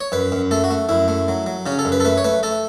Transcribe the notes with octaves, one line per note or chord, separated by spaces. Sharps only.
C#5
F#2 B4
F#2
A3 A4
F#4
A3
F#2 E4
A3
F#3
F#3
C#3 C#4
A4
F#2
B4
A4
A3 B4
C#5
A3 B4
A3 A4